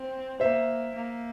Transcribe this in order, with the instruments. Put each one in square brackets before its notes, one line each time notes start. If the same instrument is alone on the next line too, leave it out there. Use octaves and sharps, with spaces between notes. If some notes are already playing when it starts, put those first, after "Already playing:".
Already playing: [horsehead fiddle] C4
[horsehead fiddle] A#3 [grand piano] C5 E5
[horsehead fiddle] A#3